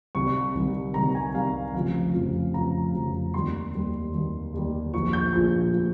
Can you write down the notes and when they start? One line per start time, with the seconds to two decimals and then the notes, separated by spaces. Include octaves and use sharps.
0.15 C2 C3 D#3 G3 C#6
0.55 C2 C3 D#3 G3
0.94 C2 C3 D#3 G3 A#5
1.15 G#5
1.34 C2 C3 D#3 G3 F5
1.74 F1 F2 C#3 F3 F5
2.14 F1 F2 C#3 F3
2.54 F1 F2 C#3 F3 A#5
2.94 F1 F2 C#3 F3
3.34 D#2 D#3 G3 C6
3.74 D#2 D#3 G3
4.14 D#2 D#3 G3
4.54 D#2 D#3 G3
4.93 A#1 A#2 F3 C#6
5.13 G6
5.33 A#1 A#2 F3 G6
5.73 A#2 F3